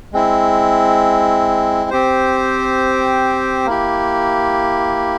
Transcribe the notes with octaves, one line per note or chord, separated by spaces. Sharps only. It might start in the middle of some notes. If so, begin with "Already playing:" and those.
G#3 C4 E4
C4 G4 C5
A#3 E4 G4